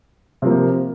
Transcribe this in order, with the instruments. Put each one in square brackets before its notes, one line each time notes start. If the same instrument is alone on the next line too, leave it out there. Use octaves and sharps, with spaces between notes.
[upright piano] C3 F3 A#3